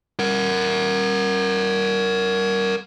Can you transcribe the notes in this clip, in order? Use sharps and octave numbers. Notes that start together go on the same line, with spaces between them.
A#4 F#5